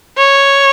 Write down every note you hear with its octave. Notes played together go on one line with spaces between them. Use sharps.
C#5